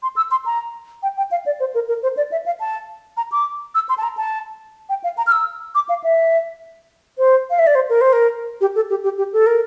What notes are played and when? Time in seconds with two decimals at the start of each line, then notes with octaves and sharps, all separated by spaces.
0.03 C6
0.17 E6
0.31 C6
0.46 A#5
1.03 G5
1.17 G5
1.31 F5
1.46 D5
1.60 C5
1.75 A#4
1.89 A#4
2.03 C5
2.17 D5
2.32 E5
2.46 F5
2.60 A5
3.17 A#5
3.32 D6
3.75 E6
3.89 C6
3.98 A5
4.03 A#5
4.17 A5
4.89 G5
5.04 F5
5.18 A#5
5.27 F6
5.32 E6
5.75 D6
5.89 F5
6.04 E5
7.18 C5
7.50 F5
7.59 E5
7.67 D5
7.75 C5
7.90 A#4
8.01 C5
8.13 A#4
8.61 G4
8.76 A4
8.90 G4
9.04 G4
9.18 G4
9.33 A4
9.47 A#4